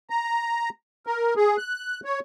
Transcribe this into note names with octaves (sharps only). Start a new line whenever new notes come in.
A#5
A#4
G#4
F#6
C#5